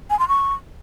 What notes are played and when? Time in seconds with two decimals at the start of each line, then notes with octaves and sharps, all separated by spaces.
0.10 G#5
0.19 C6
0.28 C#6